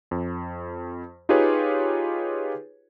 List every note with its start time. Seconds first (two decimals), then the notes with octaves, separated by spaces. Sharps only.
0.11 F2
1.29 D#4 F4 G4 G#4 B4 C#5